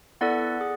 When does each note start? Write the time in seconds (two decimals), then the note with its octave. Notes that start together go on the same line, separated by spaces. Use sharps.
0.21 B3 E4 A4 D5 F#5
0.61 G#4